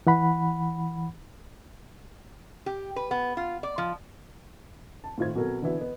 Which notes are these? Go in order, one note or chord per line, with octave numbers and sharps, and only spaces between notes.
E3 F#5 B5
G4
B4
B3
F4
D5
F3
A5
A2 D#3 F4 C5 G#6
B2 F#3 C4 A4 A#4
D3 E3 B3 E4 F#4
B3 D#5